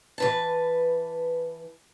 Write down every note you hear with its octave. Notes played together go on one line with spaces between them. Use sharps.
E3 B4 A5